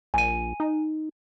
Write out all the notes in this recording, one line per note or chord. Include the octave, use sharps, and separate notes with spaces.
A#1 G#5 D#7
D#4